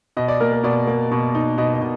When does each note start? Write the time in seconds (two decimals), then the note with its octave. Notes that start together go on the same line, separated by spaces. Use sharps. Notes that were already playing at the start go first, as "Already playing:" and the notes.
0.17 B2 D#5
0.28 D5
0.40 A#3 A#4
0.52 A#4
0.63 B2 D5
0.87 A#3
1.11 B2
1.35 D#4
1.58 B2 D#5
1.74 D#5
1.81 B2